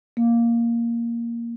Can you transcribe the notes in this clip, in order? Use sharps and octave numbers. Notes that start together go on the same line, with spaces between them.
A#3